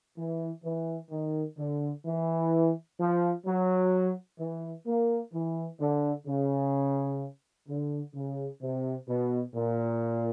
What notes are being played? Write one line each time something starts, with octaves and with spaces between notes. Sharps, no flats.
E3
E3
D#3
D3
E3
F3
F#3
E3
A#3
E3
D3
C#3
D3
C#3
C3
B2
A#2